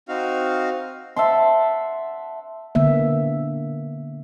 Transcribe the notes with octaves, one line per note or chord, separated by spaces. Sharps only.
C4 D#4 F#4 F5
E5 F#5 A5 C6
D3 A#3 B3 E5